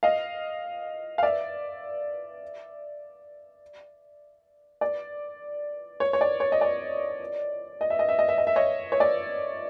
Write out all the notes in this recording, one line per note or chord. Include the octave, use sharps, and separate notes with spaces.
D#5 F5
F5
D5 E5
D5
C#5
C#5
D5
C#5
D#5
D5
D#5
E5
D#5
E5
D#5
E5
D#5
E5
C#5 D#5
C#5
D5